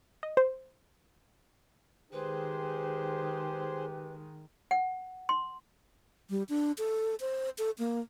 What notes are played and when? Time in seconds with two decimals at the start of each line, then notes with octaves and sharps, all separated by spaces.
0.23 D#5
0.37 C5
2.13 D#3 G#3 G4 G#4 B4 C5
4.71 F#5
5.29 C6
6.30 G3
6.49 D4
6.78 A4
7.20 C5
7.58 A4
7.79 A#3